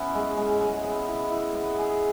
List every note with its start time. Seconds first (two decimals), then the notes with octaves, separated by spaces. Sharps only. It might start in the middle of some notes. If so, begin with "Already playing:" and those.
Already playing: E3 B3 C#4 E4
0.14 G#3
0.37 G#3
0.60 G#3
0.84 B3
1.08 E4
1.31 E4
1.55 B3
1.78 G#4